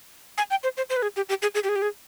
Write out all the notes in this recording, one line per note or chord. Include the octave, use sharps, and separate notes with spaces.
G#5
G5
C5
C5
C5
B4
G#4
G4
G4
G#4
G#4
G4
G#4
G4
G#4